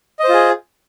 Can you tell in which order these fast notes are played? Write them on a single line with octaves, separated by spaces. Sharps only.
D#5 C5 F4 G#4